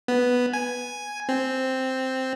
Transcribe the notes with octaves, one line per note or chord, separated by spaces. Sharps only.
B3
G#5
C4